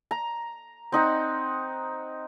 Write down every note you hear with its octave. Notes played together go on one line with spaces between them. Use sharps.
A#5
C4 D#4 F#5